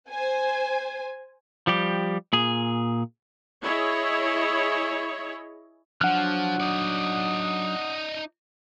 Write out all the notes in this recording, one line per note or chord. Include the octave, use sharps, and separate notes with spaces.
C5 G#5
F3 G3 G4
A#2 G#4
E4 G#4 C#5 D#5
F3 F#3 D4 F#5 F6 F#6
D#4 D5 D#6